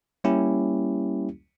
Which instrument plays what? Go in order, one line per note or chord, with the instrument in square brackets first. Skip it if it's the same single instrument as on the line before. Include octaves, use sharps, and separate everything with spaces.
[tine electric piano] G3 A#3 C#4 E4 G4